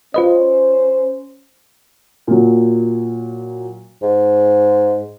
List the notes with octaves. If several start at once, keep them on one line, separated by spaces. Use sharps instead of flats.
C#4 F4 B4 C5 D#5
A#2 F#3
G#2